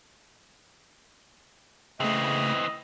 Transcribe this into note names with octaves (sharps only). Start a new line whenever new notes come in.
C#3 E3 A3 C4 D#5